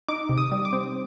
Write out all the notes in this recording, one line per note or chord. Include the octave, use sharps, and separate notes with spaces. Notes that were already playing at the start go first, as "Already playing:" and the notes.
D#4 D6
C3
D#6
G3
D6
C4